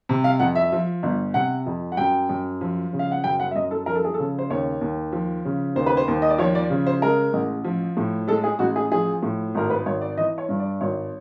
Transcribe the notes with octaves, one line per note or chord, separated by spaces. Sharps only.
C3
F5
F2 F#5
E5
F3
G1
C3 F#5
F2
F#5
F#2 G5
F#2
F3
C#3
F5
F#5
F#2 G5
F#5
E5
F#2 D#5
A4
F3 A#4
A4
G#4
C#3 A4
C5
D#2 C#5
D#2
F3
C#3
D#2 C5
B4
C5
D#2
D#5
D5
F3 C#5
D5
C#3
C5
G#3 A#4
A1
F3
A2
G#3 A4
G#4
A1 F#4
G#4
F3 G#4
A2
G#1 A#4
B4
G#1 C#5
D5
E3 D#5
C#5
G2
D5
G#1 C#5